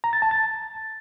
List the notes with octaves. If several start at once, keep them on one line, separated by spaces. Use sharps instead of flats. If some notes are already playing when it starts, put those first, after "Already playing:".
A#5
A6
A5
A6